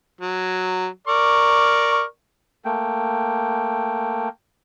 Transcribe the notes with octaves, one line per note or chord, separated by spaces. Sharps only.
F#3
A#4 D5 C#6
A3 A#3 G5